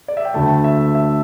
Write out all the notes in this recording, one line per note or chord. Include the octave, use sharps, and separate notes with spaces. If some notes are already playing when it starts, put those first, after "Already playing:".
D5
E5
G5
D2 D3 A3 A5
E5
E5